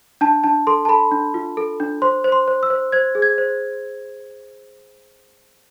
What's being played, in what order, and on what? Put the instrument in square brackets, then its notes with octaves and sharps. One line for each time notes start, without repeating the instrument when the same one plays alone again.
[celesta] D4 A5
D4 A5
A4 C6
A5
A4 B5
D4
F4
A4
D4
C5 C6
C5
C6
C5
E6
C5
C5 G#6
G#4
G#6
C5